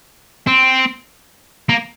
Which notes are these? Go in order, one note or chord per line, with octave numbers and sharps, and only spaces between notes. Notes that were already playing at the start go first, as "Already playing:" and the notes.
C4
A#3